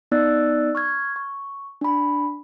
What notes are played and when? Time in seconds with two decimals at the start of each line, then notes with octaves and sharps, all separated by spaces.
0.12 B3 D#4 D5 E6 F#6 A6
0.75 C#6 F6 G#6
1.16 C#6
1.81 D4 B5